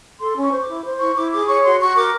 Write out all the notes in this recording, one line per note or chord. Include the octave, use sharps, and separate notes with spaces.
A4 C6
C#4
C#6
C5
D6
E4
C5
E4 C#6
E4 D6
G#4 D6
C#5 C#6
F#4 C6
F#4 C#6
A#4 D6